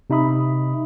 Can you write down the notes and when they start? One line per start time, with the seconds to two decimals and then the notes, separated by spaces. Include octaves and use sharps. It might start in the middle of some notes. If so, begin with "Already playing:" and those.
0.10 C3 D#4 E5 B5 D#6